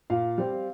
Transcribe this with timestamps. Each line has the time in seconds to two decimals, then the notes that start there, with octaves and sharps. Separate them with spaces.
0.10 A#2 F5
0.38 G3 C4